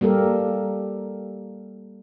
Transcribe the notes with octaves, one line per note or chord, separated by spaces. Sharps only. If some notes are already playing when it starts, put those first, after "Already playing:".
G3 A#3 G4 A4 A#4